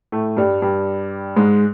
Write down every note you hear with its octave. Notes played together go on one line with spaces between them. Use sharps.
A2 A3
G2 G3
G2 G3
G#2 G#3